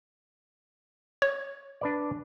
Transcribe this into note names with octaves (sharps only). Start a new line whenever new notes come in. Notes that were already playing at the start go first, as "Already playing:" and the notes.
C#5
D4 B4 D5